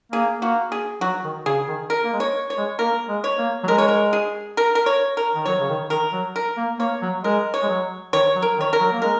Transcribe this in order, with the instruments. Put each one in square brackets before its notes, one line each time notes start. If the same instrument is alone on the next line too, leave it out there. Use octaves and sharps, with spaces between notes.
[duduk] A#3 [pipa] G#4
[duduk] A#3 [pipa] F#4
[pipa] G#4
[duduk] F#3 [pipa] F#4
[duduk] D#3
[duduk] C#3 [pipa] G#4
[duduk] D#3
[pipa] A#4
[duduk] A#3
G#3
[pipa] C#5
C#5
[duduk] G#3
[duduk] A#3 [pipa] A#4
[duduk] G#3
[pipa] C#5
[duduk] A#3
F#3
[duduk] G#3 [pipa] A#4
[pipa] C#5
A#4
G#4
A#4
A#4
C#5
A#4
[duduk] D#3
[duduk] F#3 [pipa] C#5
[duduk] C#3
D#3
[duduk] D#3 [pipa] A#4
[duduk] F#3
[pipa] A#4
[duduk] A#3
[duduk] A#3 [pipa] C#5
[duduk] F#3
[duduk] G#3 [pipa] A#4
[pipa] C#5
[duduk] G#3
F#3
[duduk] D#3 [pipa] C#5
[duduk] F#3
[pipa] A#4
[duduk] D#3
[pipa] C#5
A#4
[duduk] F#3
A#3
[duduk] G#3 [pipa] A#4